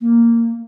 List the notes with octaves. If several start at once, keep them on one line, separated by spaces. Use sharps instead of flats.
A#3